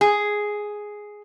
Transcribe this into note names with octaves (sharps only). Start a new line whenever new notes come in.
G#4